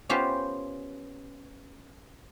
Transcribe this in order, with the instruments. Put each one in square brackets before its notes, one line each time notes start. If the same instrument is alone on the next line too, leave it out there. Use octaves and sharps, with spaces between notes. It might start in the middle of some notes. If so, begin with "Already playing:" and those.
[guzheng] B3 C#4 F4 G4 B4 C5